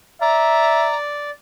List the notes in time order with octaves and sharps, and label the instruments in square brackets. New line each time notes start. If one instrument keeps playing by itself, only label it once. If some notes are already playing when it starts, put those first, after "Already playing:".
[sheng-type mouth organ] D5 [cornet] E5 [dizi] A#5